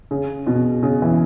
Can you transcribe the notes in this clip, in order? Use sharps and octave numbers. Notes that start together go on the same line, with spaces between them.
C#3
B2
C#3
E3